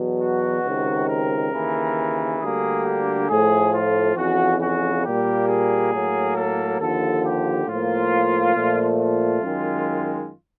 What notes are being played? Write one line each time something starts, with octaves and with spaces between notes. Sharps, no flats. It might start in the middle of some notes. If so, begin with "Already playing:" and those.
Already playing: E2 B2 F#3
F#4
C#2 C3 D#3
A#4
D#2 C#3 E3
D2 D3 G3 A#3 G#4
G4
A2 F3 A3 G#4
F4
F2 C#3 E3 F#4
F#4
A#2 G3 A#3 G4
G#4
A2 F#3 A#3
A4
D#2 D3 F3 A4
G4
A2 F3 A#3 F4
A#2 F3 A3
F4
F#2 D#3 G#3